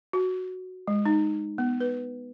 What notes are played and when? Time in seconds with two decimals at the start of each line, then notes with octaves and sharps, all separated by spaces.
0.13 F#4
0.87 G#3
1.06 D#4
1.58 B3
1.80 B4